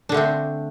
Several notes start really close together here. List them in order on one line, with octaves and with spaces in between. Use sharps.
D4 D3 A3 C4